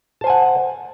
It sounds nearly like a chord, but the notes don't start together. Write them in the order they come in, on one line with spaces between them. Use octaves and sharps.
A5 C5 G#5 F#5